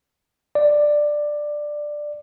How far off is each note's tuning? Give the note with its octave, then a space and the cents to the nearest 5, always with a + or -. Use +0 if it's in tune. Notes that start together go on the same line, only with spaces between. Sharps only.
D5 +10